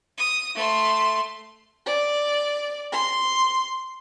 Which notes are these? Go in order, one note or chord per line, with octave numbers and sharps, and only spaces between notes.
D#6
A3 C6
D5
C6